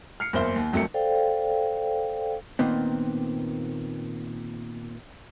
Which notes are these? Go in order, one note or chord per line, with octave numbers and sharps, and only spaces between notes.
F6 C7 C#7
F#1 E2 A#3 C5 E5 G7
D#2
G1 F2 F#3 A3 A#4 C#7
A4 C5 D5 F5 G5
A#2 D#3 B3 C4